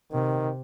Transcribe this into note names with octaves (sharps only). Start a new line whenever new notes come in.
C3 D#3